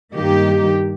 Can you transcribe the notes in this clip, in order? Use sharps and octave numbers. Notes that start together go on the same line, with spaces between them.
G2 D#3 A#3 D#4 G4